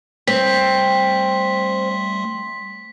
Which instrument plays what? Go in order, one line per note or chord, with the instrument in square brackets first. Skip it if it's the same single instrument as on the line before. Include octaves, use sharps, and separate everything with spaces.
[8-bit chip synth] G3 A3 C6 [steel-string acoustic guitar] C4 [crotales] B6